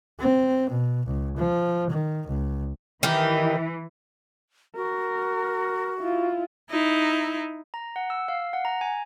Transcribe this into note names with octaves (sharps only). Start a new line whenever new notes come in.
C4
B2
C#2
F3
D#3
C#2
D#3 E3 G4
F#4 A#4
E4 F4
D#4 E4
A#5
F#5
E6
F5
F#5
A#5
G#5